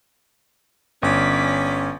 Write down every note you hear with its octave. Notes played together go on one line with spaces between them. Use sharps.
G1 C#4 D5 B6